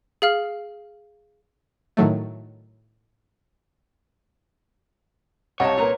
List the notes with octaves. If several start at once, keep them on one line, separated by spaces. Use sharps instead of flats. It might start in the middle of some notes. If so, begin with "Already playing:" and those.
G#4 F5 F6
A2 D#3 F#3 A3
C2 G3 C#5 D#5 F5 F#5 A5 C#6
A#2 A#3 B4 A#5